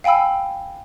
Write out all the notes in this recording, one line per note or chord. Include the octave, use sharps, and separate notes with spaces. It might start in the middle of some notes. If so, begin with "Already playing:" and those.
F5 G5 G#5 B5 E6